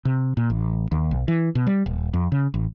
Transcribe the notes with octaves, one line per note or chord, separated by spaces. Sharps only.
C3
A#2
A1
D#2
B1
E3
B2
G3
D#1
F2
C#3
A1